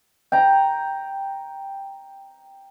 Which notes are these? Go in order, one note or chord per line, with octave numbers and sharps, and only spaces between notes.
G5 A#5